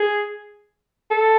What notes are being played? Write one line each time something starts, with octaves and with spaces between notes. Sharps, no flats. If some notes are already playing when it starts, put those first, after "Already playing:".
Already playing: G#4
A4